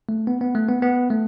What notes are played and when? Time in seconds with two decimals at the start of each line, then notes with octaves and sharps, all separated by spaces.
0.09 A3
0.27 B3
0.41 B3
0.55 A3
0.68 B3
0.82 B3
1.10 A3